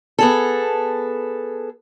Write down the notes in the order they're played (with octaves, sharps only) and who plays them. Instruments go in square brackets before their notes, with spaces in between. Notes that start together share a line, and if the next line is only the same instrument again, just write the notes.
[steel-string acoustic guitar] B3 G#4 A4